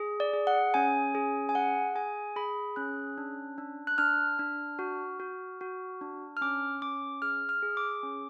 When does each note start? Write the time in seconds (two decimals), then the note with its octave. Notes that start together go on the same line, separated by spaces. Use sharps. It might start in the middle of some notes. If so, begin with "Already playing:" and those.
Already playing: G#4
0.20 D5
0.33 G#4
0.47 F#5
0.74 C#4 G#5
1.15 G#4
1.49 G#5
1.55 G#4 F#5
1.95 G#4 G#5
2.36 G#4 B5
2.76 C#4 F#6
3.18 D4
3.58 D4
3.87 F#6
3.98 D4 F6
4.39 D4
4.79 F#4
5.20 F#4
5.61 F#4
6.01 D4
6.37 F6
6.42 C#4 D6
6.82 C#4 D6
7.22 G#4 F6
7.49 F6
7.63 G#4
7.77 D6
8.03 C#4